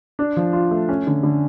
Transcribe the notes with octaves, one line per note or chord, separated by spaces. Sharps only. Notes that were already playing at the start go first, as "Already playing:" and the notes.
D4
F3
F4
A3
C#4
D3
D3